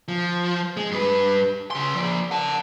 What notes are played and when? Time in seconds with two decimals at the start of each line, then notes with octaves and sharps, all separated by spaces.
0.08 F3
0.77 G#3
0.91 G2 B4
1.71 C#3 C6
1.95 F3 D5
2.31 F#5 A5